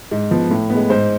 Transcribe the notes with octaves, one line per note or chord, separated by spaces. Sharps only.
G#2
F3 B3
A2
B3
G#3
G#2 C5